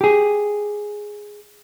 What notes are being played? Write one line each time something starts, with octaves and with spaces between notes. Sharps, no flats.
G4 G#4